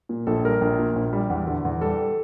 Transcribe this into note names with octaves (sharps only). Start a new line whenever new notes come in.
A#2
A#1 A4
G3 A#4
A#1
A#2
A#1
G3
E2
D3
E2
G3 A4